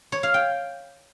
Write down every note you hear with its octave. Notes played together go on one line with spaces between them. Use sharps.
C#5
F5
G5